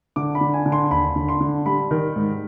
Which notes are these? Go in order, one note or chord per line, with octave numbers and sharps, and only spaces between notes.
D3 D6
B5
D3
G#5
D3
C6
D#2 B5
D3
C6
D3
G3 B5
D#3
G#2